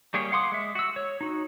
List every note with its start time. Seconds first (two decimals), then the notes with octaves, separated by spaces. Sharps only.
0.14 G3 A#3 G4 G#4 C#5
0.32 F5 F#5 C6 D6 D#6
0.52 G#3 E5
0.75 F#4 E6
0.96 C#5
1.21 D#4 F#4